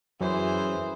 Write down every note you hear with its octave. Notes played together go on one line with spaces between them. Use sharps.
F#2 E3 G#4 C5